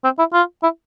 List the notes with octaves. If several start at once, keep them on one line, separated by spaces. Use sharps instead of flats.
C4
E4
F4
E4